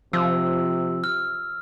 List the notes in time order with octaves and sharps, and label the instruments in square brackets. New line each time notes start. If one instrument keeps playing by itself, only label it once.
[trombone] C3 [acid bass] F3 [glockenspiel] E6
[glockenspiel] F6